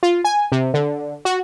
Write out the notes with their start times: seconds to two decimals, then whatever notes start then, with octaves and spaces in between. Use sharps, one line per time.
0.03 F4
0.24 G#5
0.52 C3
0.74 D3
1.25 F#4